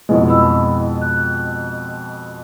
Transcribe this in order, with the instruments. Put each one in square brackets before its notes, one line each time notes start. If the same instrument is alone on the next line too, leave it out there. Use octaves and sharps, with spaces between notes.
[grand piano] F2 B2 G#3 [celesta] E4
[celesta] E4 B5 E6
F#6